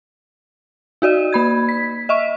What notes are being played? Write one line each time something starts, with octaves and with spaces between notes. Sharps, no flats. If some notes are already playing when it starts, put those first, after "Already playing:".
D#4 F#4 D5 D#5
A#3 B5 G#6
B6
D#5 E5 C#6